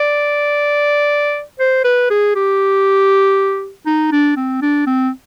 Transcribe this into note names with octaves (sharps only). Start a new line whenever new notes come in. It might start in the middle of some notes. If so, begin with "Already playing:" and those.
Already playing: D5
C5
B4
G#4
G4
D#4
D4
C4
D4
C4